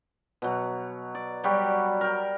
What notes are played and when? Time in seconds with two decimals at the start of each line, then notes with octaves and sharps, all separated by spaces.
0.42 B2 F#3
1.15 D5
1.44 F#3 G3 F#4 G4
2.01 A#4 G5